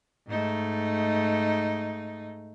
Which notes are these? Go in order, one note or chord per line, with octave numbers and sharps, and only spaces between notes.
G#2 A3 D#4